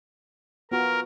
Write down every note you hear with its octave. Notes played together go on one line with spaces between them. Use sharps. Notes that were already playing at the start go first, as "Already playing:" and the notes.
B3 F4 F#4 A#4